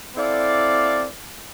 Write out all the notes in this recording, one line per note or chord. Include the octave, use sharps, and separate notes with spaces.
C4 E4 A4 D5 F5